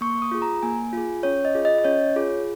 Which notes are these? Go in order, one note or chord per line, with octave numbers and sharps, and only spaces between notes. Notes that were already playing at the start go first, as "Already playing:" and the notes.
A#3 C#6
D#6
F4 G#4
A#5
A#3 G#5
F4 G#4
C#4 C#5
D#5
F4 G#4
D#5
D#5
C#4 C#5
F4 G#4